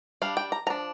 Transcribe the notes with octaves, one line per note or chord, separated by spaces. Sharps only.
G3 D4 F5
G5
A#5
F3 D4 A#5